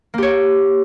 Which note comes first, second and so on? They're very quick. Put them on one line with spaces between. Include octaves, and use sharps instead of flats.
A#3 G4 C#5